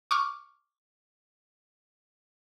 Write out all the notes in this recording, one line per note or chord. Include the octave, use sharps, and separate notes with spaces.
C#6 D6 F6